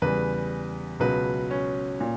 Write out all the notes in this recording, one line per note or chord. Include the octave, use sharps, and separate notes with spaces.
E2 C#3 G3 B4
C#2 B2 F#3 B4
C#4
A#2